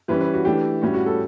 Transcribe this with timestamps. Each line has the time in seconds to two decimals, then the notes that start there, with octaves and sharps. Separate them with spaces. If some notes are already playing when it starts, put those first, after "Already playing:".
0.08 E3 G3 C#4 B4
0.21 B4
0.34 F#4
0.45 E3 A3 D4 G4
0.82 A2 G3 C#4 F#4
0.94 F#4
1.06 A4